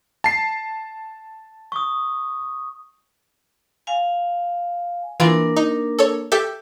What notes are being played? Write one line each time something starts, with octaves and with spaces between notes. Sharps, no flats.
A5 C7
C#6 D#6
F5 G#5
E3 A#3 D4 F4 A#4 G#6
D#4
A4 C#5
G4 A4 E5